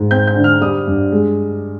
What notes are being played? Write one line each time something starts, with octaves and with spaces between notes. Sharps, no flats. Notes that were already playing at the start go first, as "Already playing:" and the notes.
Already playing: G#2
C4 G6
G6
D3
F6
G3 D#6
G2
G#3